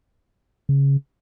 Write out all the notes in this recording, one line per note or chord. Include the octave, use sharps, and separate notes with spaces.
C#3